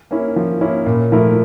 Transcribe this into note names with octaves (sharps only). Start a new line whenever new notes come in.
A#3 C#4 E4
F3
A#3 C#4 E4
A#2
F3 A3 E4 A#4